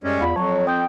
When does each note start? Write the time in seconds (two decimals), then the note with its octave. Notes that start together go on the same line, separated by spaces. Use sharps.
0.04 F#2 G3 G#3 C#4
0.20 E2 F4 D5 F5 B5
0.36 F2 F#3 C#5 A5 C#6
0.67 C4 G5 D#6 G6